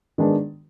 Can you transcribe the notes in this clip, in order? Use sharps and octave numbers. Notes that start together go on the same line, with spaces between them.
D#3 G#3 B3 D4